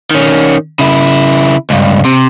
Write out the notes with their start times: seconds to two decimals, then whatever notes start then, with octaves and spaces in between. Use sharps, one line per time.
0.11 D#3 C#4
0.79 C#3 E4
1.70 C#2 G2
2.05 C3